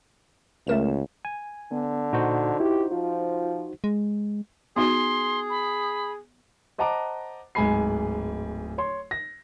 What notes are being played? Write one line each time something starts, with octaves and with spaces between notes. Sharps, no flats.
C#2 A3 A#4 E7
G#5
D3 B3
A#2 D#4 F#4 C5
E4 G4
F3 F4
G#3
B3 D#4 F#4 G#4 C6
B5
C5 D#5 F#5 A5 A#5 D6
D1 G#2 G#3 G#5 B5 C7
C#5 C6
A#6